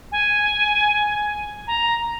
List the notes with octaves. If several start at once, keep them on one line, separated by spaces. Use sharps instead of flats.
G#5
A#5